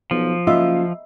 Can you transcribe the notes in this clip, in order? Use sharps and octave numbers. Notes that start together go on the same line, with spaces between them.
B1 F3
F#1 F4 D#5 E5